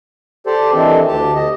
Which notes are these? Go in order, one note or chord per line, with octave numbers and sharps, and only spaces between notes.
G4 A4 C5 D5
D#3 E3 C4 D4 A4
D2 G4 A5
D#5